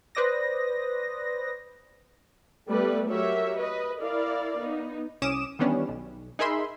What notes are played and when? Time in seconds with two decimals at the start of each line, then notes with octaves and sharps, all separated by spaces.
0.15 B4 C5 D5 D#6 A#6
2.69 G3 A3 B3 B4 D5
3.07 F#3 G4 A#4 C#5 E5
3.57 B4 D#5
4.01 E4 A#4 D5 F5
4.59 B3 D#4
5.22 C2 C#4 D6 D#6 E7
5.59 D#3 E3 G3 B3 C#4 D4
5.88 B1
6.39 D#4 G#4 A#4 E5 B5 C6